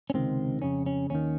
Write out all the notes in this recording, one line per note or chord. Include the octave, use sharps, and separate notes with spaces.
C#4
C#2 C3 D#3 C4
F2 C#3 C#4
C#4
D#2 D#3 C#4